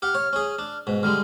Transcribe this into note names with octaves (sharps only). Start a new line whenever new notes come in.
G4 F#5 F6
C#5
C#4 G#4
D4
G#2 B2
D3 G3 G#3 F6